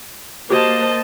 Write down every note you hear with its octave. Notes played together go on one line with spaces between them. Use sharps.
A#3 F#4 G4 C5 D#5 A5